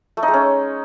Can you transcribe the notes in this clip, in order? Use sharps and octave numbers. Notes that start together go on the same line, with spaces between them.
A3
D#4
G#3
C#4